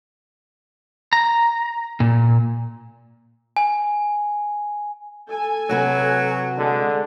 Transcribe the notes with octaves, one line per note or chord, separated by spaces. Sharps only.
A#5
A#2
G#5
A4 G#5
C3 F#3 F#4 B4
D3 G#3 G#4